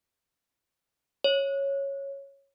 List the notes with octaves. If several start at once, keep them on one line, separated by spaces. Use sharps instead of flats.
C#5